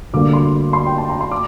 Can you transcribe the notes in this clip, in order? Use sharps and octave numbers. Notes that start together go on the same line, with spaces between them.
D2 D3 G3 A#3 D6
C6
C6
G5
A5
A#5
C6
D6